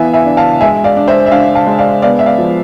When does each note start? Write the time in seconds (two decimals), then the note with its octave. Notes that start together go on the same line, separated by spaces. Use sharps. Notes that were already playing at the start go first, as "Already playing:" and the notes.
Already playing: E3 B3 E5 F5 G#5
0.13 E5 G#5
0.25 D4
0.37 F5 A5
0.61 G#3 E5 G#5
0.84 D5 F5
0.97 D4
1.08 C5 E5
1.26 E5
1.31 D4 D5 F5
1.55 F5 A5
1.67 G#3
1.79 D5 F5
2.02 B3 D5 F5
2.19 E5
2.26 D5 F5
2.38 F3